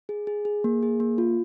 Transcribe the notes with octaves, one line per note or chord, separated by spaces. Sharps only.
G#4
G#4
G#4
A#3
G#4
A#3
F4